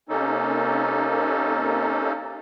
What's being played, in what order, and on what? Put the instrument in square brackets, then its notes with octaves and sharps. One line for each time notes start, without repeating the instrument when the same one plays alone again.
[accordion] C3 A#3 C#4 D#4 A4